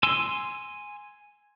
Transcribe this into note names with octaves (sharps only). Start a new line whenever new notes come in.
G#5 C6 E6